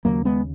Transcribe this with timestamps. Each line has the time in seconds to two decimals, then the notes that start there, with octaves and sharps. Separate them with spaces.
0.05 D#2 C#3 F#3 A#3
0.25 G#3 B3